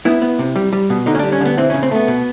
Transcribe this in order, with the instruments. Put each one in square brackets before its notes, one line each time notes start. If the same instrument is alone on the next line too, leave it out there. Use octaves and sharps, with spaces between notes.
[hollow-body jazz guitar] B3 E4
B3
C3
G3
G3
B2
D3 D#4
C#4
D4
G3
C#4
D3 B3
E3 C4
C#4
C#3
C4
A3 B3
B2